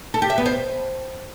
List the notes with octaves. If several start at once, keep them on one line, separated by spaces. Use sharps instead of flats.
A4
G4
E5
B3
C5